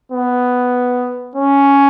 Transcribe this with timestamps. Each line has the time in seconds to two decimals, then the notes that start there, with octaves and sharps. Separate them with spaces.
0.12 B3
1.36 C#4